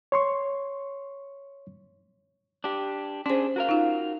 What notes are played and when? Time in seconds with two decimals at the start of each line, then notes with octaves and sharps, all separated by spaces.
0.12 C#5 C6 C#6
2.64 D4 G4
3.26 C#4 D4 G#4 C5
3.56 F#4 A#4 F5
3.69 D#4 F4